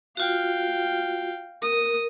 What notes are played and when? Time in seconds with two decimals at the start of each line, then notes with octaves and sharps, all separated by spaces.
0.17 F4 F#4 F5 G5
1.62 A#4 D#6